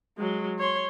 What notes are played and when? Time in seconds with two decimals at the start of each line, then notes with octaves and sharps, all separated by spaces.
0.18 F#3 G#3
0.59 C#5 C6